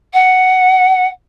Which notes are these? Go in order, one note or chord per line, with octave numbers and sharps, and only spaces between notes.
F#5